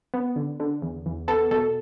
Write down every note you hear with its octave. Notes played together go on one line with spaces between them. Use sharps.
B3
D3
D3
E2
E2
B3 A4
B2 A4